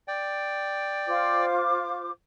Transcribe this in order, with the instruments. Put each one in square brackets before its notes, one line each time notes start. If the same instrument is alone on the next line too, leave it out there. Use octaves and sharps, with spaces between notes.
[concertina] D5 G5
[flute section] F4 C5 D6